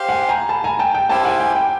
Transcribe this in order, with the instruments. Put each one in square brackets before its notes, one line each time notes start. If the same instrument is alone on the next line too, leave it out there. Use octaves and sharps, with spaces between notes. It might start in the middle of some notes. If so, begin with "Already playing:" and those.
Already playing: [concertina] G4 C5 F5
[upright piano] F#5 G#5
G#5 A#5
A5 B5
G#5 A#5
G5 A5
G5
[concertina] C#4 E4 G4 C5 [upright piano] G5 A5
[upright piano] F#5 G#5
G5
G5